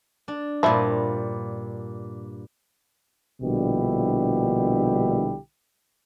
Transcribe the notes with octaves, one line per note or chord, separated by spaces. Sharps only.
D4
G2 A#2 F3 E4
A#1 B2 D3 G3 E4 G4